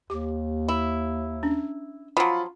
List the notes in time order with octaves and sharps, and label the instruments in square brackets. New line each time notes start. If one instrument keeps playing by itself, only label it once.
[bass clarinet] D#2 [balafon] G4 D6
[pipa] E4
[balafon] C#4 D4
[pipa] F3 F#3 [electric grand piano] F4 B5